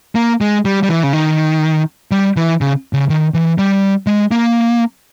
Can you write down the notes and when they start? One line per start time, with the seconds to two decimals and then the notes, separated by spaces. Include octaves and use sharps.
0.15 A#3
0.41 G#3
0.65 G3
0.83 G3
0.89 E3
1.03 C#3
1.13 D#3
2.11 G3
2.36 E3
2.61 C#3
2.93 C#3
3.10 D#3
3.34 E3
3.58 G3
4.07 G#3
4.31 A#3